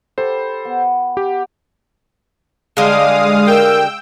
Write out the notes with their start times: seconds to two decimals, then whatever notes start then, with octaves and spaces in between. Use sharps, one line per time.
0.18 G4 A4 C5 B5 C6
0.65 B3
1.17 G4 F#5
2.77 D3 G3 G#3 F5 D#6
3.47 A#4 G5 E6